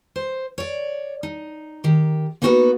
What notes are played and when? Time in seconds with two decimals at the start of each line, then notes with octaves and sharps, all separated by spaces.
0.16 C5
0.58 C#5 D5
1.23 D#4
1.84 D#3 G4
2.42 A#3 B3 D#4 F#4 G4 B4